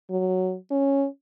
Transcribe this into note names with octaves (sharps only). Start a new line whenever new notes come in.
F#3
C#4